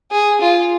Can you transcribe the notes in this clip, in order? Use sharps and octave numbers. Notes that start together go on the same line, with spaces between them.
G#4
F4